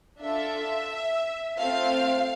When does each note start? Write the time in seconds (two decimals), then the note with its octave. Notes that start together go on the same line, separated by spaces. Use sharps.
0.21 D4 F4 A4 E5
1.59 A3 C4 F4 F5